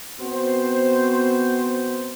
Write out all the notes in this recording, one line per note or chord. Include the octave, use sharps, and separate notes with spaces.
B3 C4 F#4 C5